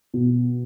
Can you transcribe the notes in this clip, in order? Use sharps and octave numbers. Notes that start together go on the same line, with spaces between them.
B2